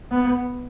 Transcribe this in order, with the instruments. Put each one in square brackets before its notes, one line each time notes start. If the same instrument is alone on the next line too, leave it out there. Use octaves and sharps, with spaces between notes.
[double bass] B3